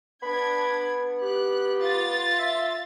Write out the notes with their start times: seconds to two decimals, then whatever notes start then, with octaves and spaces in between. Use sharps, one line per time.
0.22 B3 D4 B5 G#6
1.22 G4 F#6
1.79 F4 A6
2.39 E5